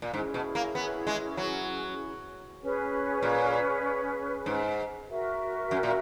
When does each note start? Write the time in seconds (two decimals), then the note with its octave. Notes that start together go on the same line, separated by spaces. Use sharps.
0.02 A#2
0.13 G#2 C#4 E4 G#4
0.34 B2
0.55 A#3
0.75 B3
1.07 G#3
1.37 F#3
2.61 C#4 G#4 B4
3.22 A#2
4.46 G#2
5.09 F#4 A#4 E5
5.71 F#2
5.83 A#2